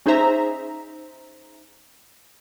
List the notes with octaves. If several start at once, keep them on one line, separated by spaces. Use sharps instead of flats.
C#4 D#4 G#4 C5 E5 A#5